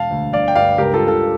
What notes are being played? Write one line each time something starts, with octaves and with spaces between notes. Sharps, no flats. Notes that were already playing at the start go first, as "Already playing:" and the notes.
Already playing: E1 F5 A5
D2
G1 D5 F5
G5
G2 D5 F5
C#2 G4 A#4
F4 A4
C#3
F4 A4